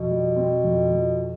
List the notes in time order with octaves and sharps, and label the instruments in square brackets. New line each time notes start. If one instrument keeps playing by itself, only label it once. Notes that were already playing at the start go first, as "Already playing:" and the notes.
Already playing: [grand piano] F2 [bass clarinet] B2
[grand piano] G3
C4
F2
F3